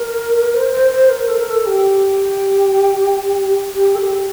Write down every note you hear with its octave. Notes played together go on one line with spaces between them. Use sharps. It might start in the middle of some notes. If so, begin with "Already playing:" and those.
Already playing: A#4
C5
C5
C5
A#4
A4
A#4
A4
G4
G4
A4
G4